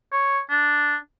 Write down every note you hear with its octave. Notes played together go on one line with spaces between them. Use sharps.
C#5
D4